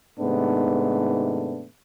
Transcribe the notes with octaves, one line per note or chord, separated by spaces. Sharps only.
G#2 C3 D#3 A3 B3 D4